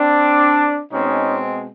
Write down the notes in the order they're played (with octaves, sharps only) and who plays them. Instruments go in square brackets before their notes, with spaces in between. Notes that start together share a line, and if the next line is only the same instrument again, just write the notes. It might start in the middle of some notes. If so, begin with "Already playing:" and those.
Already playing: [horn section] C4 D4
B2 G#3 C4 C#4 D#4